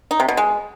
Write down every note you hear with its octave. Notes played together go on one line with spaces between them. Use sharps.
D#4
C3
B2
G#3